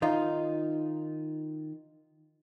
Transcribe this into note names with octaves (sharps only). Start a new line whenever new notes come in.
D#3 D#4 F4